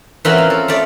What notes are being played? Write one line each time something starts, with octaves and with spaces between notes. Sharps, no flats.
E3 A#3 C4 C#4 F4 F#4
F5
A4
A3 D5